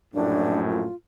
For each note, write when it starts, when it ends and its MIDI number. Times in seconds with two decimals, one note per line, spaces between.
0.13 0.86 34
0.13 0.86 42
0.13 0.86 45
0.13 0.61 62
0.69 0.95 65